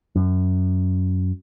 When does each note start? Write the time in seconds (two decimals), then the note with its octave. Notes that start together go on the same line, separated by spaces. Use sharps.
0.16 F#2